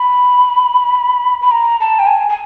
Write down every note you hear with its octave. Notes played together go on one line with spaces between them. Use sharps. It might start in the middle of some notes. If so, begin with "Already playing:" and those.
Already playing: B5
B5
A#5
A5
G5
G#5
G#5